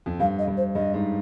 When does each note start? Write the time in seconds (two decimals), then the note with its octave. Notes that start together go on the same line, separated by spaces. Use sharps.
0.06 F2
0.20 G2 F5
0.39 D#5
0.48 G2
0.57 C5
0.75 G2 D#5
0.94 G#2